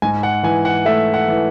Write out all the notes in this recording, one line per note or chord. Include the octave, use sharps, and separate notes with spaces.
G#2 G#5
F#5
E3 G#5
F#5
A3 E5
F#5
E3